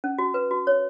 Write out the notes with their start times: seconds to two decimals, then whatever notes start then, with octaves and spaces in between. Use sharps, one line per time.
0.04 C#4
0.19 F#4
0.34 B4
0.51 F#4
0.67 C#5